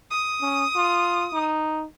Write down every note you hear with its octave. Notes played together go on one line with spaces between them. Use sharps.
D#6
C#4
F4
D#4